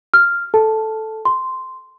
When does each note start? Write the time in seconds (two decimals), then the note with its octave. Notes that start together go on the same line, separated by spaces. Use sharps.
0.14 F6
0.54 A4 A5
1.25 C6